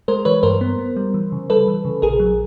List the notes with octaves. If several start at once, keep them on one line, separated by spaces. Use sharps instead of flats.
G#3 A#4 C5
E3 B4 C#5
G2 A#4 C5
B3
B3
G3
E3
C#3
G3 A4 B4
E3
C#3
A#1 G#4 A#4
F#3